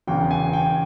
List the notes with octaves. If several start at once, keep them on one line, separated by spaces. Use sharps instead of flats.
E1 E2 C#3 E3 G5
G#5
G5